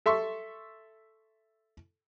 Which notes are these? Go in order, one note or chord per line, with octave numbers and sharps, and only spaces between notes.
A4 E5 C6 C#6